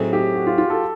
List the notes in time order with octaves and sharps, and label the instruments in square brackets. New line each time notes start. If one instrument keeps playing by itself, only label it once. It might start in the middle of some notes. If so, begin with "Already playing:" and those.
Already playing: [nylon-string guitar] A2 F#3 A3 C4 D#4 [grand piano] G#4
[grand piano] G4
F#4
F4
F4
A4